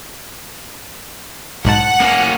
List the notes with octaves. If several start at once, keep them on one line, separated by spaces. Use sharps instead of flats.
B1 G#2 F#5 A5
A#3 C#4